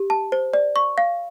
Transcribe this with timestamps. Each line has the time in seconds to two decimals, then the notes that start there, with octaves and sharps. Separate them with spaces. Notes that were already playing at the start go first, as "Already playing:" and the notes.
Already playing: G4
0.10 A5
0.32 C5
0.54 D5
0.76 C#6
0.98 F5